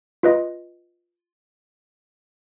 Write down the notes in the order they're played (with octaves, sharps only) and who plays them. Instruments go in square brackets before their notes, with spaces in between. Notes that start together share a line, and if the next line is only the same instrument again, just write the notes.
[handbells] F4 B4 D#5